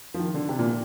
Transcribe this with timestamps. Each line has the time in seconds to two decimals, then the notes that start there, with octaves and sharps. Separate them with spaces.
0.14 F3
0.19 D#3
0.34 D3
0.49 C3
0.59 A#2